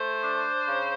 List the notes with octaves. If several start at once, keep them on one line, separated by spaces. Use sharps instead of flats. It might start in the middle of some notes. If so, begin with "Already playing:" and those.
Already playing: A3 C5
D4
C#3